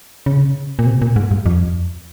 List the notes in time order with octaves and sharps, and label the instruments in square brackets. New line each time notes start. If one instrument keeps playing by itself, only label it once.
[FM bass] C#3
A#2
C3
A#2
G#2
G2
F2